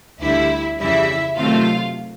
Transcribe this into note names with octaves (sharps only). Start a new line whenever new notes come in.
D2 D3 G3 E4 E5
F2 C#3 E3 G3 E4 E5
C3 D#3 F#3 A3 C4 F4 F5